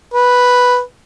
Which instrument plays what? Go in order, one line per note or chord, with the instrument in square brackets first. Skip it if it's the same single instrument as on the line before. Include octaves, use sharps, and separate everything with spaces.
[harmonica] B4